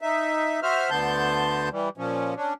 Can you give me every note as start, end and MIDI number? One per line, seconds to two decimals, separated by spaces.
0.01 0.60 63
0.01 0.60 76
0.63 0.90 66
0.63 0.90 72
0.63 0.90 76
0.63 0.90 89
0.90 1.69 38
0.90 1.69 50
0.90 1.69 59
0.90 1.69 81
0.90 1.69 84
0.90 1.69 91
1.72 1.89 52
1.72 1.89 55
1.97 2.34 46
1.97 2.34 53
1.97 2.34 61
2.36 2.53 61
2.36 2.53 62